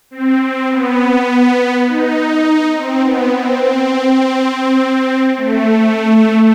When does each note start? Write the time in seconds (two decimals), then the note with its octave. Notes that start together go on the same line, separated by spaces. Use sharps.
0.11 C4
0.40 C4
0.69 B3
1.86 D#4
2.74 C4
3.03 B3
3.32 C4
3.62 C4
5.37 A3